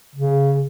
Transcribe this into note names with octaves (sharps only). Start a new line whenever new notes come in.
C#3